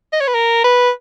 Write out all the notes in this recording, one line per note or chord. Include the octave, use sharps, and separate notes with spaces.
D#5
C#5
B4
A#4
B4